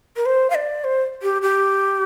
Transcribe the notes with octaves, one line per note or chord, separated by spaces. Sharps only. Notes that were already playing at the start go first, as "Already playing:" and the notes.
A#4
C5
F5
D5
C5
G4
G4